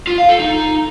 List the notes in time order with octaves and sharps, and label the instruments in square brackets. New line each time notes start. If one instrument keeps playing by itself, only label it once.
[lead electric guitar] F4
F5
A4
D#4